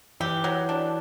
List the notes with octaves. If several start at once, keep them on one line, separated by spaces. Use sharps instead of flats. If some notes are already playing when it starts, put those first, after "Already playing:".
E3 G4
F#3
D4